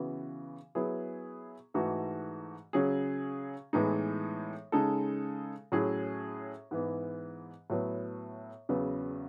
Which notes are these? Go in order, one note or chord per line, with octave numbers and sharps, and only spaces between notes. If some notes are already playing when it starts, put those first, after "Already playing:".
Already playing: C#3 E3 B3 F#4
F#3 B3 E4 G#4
G#2 E3 A3 D#4 F#4
C#3 F#3 C#4 G#4
A2 E3 G#3 B3 D#4
C#3 G#3 D#4 A4
A2 F#3 C#4 E4 G#4
G#2 E3 B3
A2 F#3 B3
E2 C#3 F#3 B3